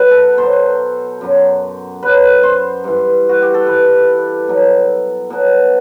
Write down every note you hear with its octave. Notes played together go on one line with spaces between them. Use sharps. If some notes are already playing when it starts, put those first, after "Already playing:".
Already playing: B2 F#3 B4
A4
B2 F#3 C5
F#2 F#3
F#2 F#3 B4
C5
G2 E3
F#4
G4
A4
G2 E3 B4
B2 F#3
B2 F#3